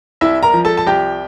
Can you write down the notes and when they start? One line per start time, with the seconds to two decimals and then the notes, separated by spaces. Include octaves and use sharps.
0.21 C2 E4 E5
0.43 A#4 A#5
0.54 F3
0.65 A4 A5
0.77 A5
0.87 C2 G4 G5